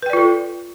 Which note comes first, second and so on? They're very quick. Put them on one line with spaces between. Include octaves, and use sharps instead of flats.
B4 G5 D5 F4 A4